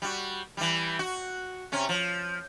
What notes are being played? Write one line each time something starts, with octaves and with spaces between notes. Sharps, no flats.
G3 F#4
E3 G3
F#4
C3 C#4
F3